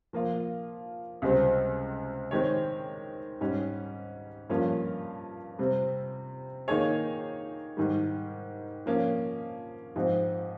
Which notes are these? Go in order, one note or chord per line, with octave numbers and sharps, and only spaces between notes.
F3 A#3 F4
C#2 C3 G3 C4
D#3 G#3 C4 G4 C#5
G#2 G3 C#4
G2 F3 A#3 C#4 F4
C3 G3 C4
D#3 A#3 D#4 G#4 C#5
G#2 D#3 G3
F3 A#3 C#4
G#2 F3 C4 G4